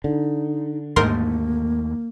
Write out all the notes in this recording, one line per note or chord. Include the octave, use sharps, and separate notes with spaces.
D3 D#4
D#2 G#2 A3 A#3 A#4 C6